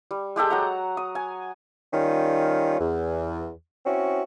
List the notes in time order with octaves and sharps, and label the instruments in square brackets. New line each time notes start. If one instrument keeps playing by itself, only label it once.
[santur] G3
G#3 G4 A4 G5
F#3 F#5 A#5
D#6
G#5
[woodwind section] D#3 G3 C#4 F4
E2
C4 C#4 E4 F#4